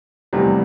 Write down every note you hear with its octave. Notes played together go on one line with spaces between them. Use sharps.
F1 E2 C3 G3